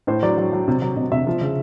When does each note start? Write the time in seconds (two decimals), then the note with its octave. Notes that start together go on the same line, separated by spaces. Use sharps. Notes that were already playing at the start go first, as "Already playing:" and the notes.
0.07 A2 C5
0.23 F#3 D5
0.38 F#3
0.53 F#3
0.68 C3
0.82 F#3
0.96 C3 D#5
1.12 C3 E5
1.27 F3
1.41 C#3